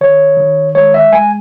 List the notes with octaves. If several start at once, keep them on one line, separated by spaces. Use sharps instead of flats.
D#3 C#5
D#3
G#3 C#5
E5
G#3 G#5